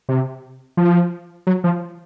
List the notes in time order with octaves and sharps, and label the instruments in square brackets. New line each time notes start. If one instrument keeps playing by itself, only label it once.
[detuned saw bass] C3
F3
F#3
F3